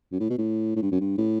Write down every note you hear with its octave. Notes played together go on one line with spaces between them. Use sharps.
F#2
A2
B2
A2
A2
G2
F#2
G2
A2